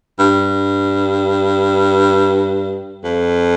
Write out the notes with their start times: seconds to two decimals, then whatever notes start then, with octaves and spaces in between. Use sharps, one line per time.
0.19 G2
3.04 F2